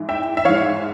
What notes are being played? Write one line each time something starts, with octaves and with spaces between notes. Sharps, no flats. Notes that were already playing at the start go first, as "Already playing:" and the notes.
Already playing: G#2 E3
E5 G5
E5
G#2 E3 C#5 F5